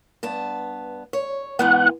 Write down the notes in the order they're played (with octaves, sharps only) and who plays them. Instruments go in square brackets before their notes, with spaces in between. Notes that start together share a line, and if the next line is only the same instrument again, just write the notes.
[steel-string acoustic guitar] G2 B3 A5
C#5
[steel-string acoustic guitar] G#2 E3 B3 [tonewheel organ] F#5